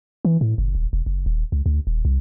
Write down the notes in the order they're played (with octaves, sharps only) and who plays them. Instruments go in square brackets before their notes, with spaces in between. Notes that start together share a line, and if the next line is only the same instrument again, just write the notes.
[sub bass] E3
A2
F#1
D#1
E1
F#1
D#1
C#2
D2
D#1
C2